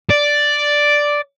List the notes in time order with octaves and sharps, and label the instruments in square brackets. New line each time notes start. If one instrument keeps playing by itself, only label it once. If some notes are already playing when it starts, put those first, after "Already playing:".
[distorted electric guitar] D5